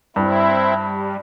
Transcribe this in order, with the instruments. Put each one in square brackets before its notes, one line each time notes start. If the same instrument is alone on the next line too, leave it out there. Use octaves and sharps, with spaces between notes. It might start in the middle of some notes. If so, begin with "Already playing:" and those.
[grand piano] G2 [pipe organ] C4 E4
[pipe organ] G3